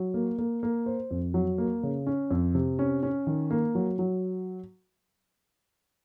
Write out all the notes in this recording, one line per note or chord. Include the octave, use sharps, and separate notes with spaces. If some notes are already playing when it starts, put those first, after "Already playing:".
Already playing: F#3
A#3
A#3
A#3
C5
F2
F#3
A#3
C#3
C#4
F2
C3
C#4
C#4
D#3
A#3
F#3
F#3